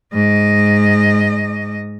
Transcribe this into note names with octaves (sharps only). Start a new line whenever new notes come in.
G#2 D#5